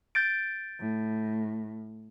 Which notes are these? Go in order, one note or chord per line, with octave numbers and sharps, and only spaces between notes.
G6 A6 D7
A2